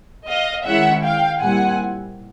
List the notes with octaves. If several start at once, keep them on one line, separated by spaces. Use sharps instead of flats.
D#5 F5
D#3 G#3 C#4 E4 E5 F#5
F5 G5
A#2 G3 C4 E4 F#5 G#5